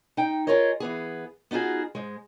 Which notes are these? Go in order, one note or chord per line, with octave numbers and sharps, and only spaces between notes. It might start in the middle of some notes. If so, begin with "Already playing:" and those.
D#4 G5
F4 G#4 A#4 C#5 D#5
E3 B3 G#4
B3 D#4 F4 F#4 G#4
G#2 G#3